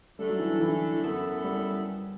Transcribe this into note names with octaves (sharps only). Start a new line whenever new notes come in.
D3 G3 A3 D4 A4
F#3
E3
E3
E3
F#2 F#3 B3 E4 A4
G3